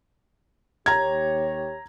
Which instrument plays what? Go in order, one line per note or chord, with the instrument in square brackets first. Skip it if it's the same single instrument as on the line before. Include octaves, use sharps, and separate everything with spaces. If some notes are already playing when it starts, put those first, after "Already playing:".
[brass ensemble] D#2 G4 C#5 [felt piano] A#5 G#6